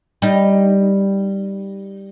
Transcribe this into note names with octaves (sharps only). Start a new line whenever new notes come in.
G3 D#4